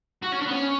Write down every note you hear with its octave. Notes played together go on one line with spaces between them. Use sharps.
F#4
C#4
D4
B3
C#4